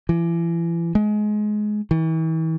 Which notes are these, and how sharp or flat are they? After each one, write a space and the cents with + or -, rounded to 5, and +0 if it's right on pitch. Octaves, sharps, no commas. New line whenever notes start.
E3 +35
G#3 +20
E3 -40